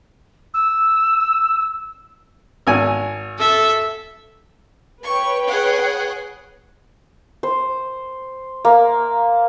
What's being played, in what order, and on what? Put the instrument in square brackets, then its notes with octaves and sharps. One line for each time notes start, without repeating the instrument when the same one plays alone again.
[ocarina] E6
[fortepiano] G#1 G#5
[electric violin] A4 E5
[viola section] B4 C#5 G5 [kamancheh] C#6
[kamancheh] G#4 F#5
[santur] C5
A#3